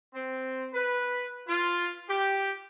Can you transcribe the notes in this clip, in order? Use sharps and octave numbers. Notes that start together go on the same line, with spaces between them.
C4
B4
F4
G4